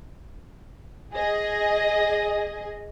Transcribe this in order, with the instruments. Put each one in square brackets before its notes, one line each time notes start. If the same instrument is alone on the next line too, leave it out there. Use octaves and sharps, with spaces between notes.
[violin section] G#4 D#5